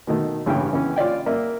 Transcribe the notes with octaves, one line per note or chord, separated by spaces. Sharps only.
B2 D#3 A3
A1 G2 C#3 C#5 G5
C#3 E3 B3 C#4
F4 C#5 D5 G5
A#3 D5 E5